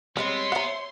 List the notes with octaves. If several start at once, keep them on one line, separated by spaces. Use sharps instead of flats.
G3 G#3 B3 C4 A#4 C#5 C6
C5 E5 F#5 A#5